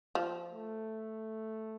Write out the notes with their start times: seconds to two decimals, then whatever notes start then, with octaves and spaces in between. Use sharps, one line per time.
0.15 F3
0.52 A3